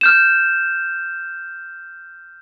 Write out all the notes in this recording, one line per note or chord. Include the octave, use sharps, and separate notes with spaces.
F6 G6 E7